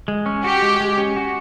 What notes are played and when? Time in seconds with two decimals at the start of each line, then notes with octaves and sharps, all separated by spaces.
0.08 G#3
0.26 C#4
0.44 F#4 G4
0.62 G#3
0.80 G#3
0.98 C#4
1.16 F#4